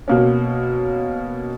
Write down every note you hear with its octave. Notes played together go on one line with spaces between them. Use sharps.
B2 A#3 C#4